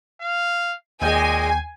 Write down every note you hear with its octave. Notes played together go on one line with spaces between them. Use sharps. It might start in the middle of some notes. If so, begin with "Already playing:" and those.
F5
D#2 A#2 G#3 D#5 G5 G#5 G6